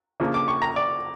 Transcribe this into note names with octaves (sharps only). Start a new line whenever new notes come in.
C#3 F3 A#3 D4
D6
C#6
A#5
D5